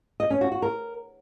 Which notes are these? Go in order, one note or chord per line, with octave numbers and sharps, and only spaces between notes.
D#5
C#4
F#4
F#4
A#4